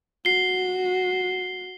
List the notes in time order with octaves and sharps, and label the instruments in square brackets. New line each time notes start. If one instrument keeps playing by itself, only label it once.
[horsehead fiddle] F#4 [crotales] C7 G7